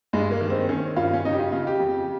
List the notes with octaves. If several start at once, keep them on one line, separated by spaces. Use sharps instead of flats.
G2 G#3
A#3
D#3
C4
D#3 C#4
G2 F4
C#4
C#3 D#4
G4
F4
C#3 F4
G4
F2